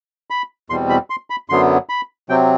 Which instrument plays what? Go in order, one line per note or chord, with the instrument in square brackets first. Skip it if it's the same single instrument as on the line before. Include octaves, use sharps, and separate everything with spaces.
[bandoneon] B5
E2 B2 G3 C4 C6
B5
C6
B5
F#2 D3 F#3 B3 C6
B5
C3 F#3 C4 G5